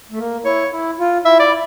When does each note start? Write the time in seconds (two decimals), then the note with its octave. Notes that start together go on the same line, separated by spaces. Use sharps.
0.11 A3
0.19 A#3
0.45 E4 C#5
0.72 E4
0.99 F4
1.25 E4 E5
1.39 D5
1.48 E4